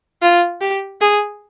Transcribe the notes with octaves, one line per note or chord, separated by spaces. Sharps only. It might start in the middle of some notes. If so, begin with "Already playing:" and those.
F4
G4
G#4